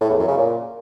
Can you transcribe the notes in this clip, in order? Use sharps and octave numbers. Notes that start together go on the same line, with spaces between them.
A2
E2
F#2
C#3
A#2